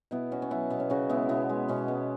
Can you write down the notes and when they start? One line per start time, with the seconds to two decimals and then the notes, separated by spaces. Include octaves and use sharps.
0.11 B2 B3 E4
0.31 B2 C#4 F#4
0.42 C#4
0.51 F#3 B3 E4
0.70 B2 B3
0.80 C#4
0.90 C#3 C#4 F#4
1.09 G#3 B3 E4
1.29 B2 B3 E4
1.49 G#3
1.68 B2 C#4
1.88 G#3 B3